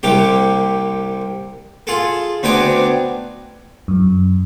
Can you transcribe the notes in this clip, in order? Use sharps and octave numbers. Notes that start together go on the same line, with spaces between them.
C2 C3 A#3 G4
F4 G#4 A4
D2 B3 C4 D4 G#5 A#5
F#2